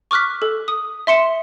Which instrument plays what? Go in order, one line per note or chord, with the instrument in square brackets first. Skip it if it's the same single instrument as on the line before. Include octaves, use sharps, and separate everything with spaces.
[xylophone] C#6 D6 F6 F#6 B6
A4
D#6
E5 C6 C#7 E7